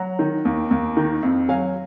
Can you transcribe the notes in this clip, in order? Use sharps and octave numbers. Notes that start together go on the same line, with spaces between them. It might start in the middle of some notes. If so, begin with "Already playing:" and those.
Already playing: F#3 F#5 A#5
D#3
D#2
D#2
D#3
F2
F#3 F5 G#5